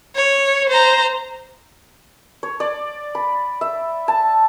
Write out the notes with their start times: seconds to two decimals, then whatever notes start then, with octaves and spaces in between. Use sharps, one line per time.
0.15 C#5
0.70 C5 A#5
2.43 C#5
2.60 D5
3.15 B5
3.61 E5
4.08 A5